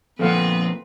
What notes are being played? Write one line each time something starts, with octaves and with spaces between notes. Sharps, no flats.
F2 A#2 B3 C4 A4 B4 F5 F#5